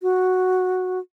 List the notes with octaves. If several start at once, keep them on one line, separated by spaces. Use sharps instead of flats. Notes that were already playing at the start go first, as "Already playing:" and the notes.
F#4